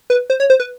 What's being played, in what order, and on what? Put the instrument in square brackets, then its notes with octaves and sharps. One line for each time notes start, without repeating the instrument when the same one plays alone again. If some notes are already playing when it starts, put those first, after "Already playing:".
[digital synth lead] B4
C5
C#5
C5
B4